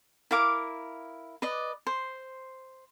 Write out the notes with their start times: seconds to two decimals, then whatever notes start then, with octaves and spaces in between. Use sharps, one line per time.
0.31 E4 A#4 F5 D6
1.42 B4 D5 D#5
1.87 C5